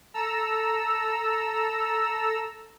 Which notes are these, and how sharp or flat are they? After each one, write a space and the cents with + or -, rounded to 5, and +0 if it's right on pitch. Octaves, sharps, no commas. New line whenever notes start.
A4 +0 A#5 +0 E6 +0